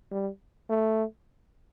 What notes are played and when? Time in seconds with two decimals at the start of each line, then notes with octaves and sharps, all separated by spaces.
0.11 G3
0.69 A3